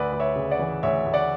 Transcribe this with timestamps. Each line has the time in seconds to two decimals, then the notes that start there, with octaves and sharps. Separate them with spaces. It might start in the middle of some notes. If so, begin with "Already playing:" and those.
Already playing: D2 B4 D5
0.12 D2
0.20 C#5 E5
0.36 C#3
0.51 D5 F#5
0.59 E3
0.83 D2 C#5 E5
1.06 D2
1.14 D5 F#5